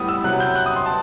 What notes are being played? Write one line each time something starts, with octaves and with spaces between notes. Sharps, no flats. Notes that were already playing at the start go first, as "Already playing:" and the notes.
Already playing: A2 G3 B3 D#6
E6
C3 F#3 B3 F#6
G6
F#6
D#6
C6
A5